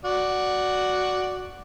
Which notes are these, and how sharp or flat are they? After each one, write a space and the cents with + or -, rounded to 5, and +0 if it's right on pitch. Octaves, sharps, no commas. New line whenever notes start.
F#4 +0 D5 +0